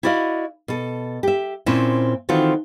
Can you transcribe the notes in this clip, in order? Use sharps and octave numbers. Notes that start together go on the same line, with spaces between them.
E4 F#4 D5 D#5 F5
B2 A4
G4 E5
A#2 C4 C#4 E4
D#3 E3 C4 F4 F#4 A4